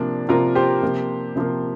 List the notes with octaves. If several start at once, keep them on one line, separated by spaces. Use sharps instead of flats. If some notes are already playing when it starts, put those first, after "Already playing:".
Already playing: C3 F3 A#3 D4
C3 F3 A#3 F4 A#4
G4 C5
C3 F3 A#3
C3 F3 A#3